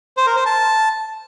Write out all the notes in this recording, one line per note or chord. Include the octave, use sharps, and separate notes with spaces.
C5
A#4
C5
A5